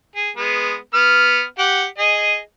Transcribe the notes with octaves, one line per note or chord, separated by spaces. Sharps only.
G#4
G#3 B3
B3 F6
G4 F#5
G#4 D#5